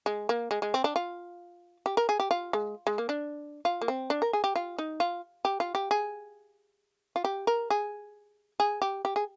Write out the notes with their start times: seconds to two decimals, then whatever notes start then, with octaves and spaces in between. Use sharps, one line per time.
0.06 G#3
0.29 A#3
0.51 G#3
0.62 G#3
0.74 C4
0.84 D4
0.96 F4
1.86 G4
1.97 A#4
2.09 G#4
2.20 G4
2.31 F4
2.53 G#3
2.87 G#3
2.98 A#3
3.09 D4
3.65 F4
3.81 A#3
3.88 C4
4.10 D4
4.22 A#4
4.33 G#4
4.44 G4
4.56 F4
4.78 D#4
5.00 F4
5.45 G4
5.60 F4
5.75 G4
5.91 G#4
7.16 F4
7.24 G4
7.47 A#4
7.70 G#4
8.60 G#4
8.82 G4
9.05 G4
9.16 G#4